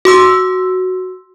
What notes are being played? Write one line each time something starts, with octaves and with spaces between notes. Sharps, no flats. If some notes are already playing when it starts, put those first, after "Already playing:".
F#4 C6 E6